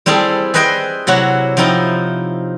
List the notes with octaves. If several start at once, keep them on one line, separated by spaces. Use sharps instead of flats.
G3 C4 E4 G#4 A4
G#4 B4 C5 D#5 E5 G5
C3 F#3 E4 F#4 F#5
F3 C4 D#4 E4 D#5